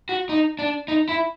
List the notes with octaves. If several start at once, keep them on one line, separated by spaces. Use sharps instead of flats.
F#4
D#4
D4
D#4
E4